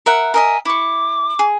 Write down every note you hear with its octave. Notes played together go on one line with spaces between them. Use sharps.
A#4 E5 F#5
A#4 D#5 E5 G#5
E4 C#6 D6
G#4